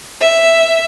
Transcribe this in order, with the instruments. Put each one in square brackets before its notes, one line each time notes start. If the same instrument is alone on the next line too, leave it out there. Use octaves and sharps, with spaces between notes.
[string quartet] E5